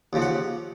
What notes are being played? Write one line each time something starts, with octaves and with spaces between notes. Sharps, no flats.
D#2 C#3 F3
F#5